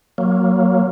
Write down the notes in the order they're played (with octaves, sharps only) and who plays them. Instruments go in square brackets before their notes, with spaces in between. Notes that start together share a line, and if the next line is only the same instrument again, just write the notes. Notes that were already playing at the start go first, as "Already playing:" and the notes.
[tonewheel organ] F#3 A#3